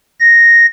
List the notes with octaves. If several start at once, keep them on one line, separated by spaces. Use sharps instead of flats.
A#6